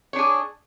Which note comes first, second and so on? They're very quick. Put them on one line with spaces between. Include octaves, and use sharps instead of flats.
C#5 D4 G#4